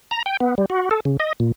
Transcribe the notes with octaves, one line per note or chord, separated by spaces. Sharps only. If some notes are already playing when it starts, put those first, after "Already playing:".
A#5
G5
B3
G3
F#4
A4
C#3
D#5
A#2